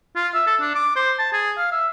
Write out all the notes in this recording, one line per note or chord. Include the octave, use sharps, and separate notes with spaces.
F4
E5
A4
D4
D6
C5
A5
G#4
F5
E5